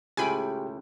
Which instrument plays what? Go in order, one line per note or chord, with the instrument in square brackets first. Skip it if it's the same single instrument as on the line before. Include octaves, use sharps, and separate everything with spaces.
[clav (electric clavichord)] C#2 A2 [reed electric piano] G4 G#4 G5 [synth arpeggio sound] G#5 B5 D7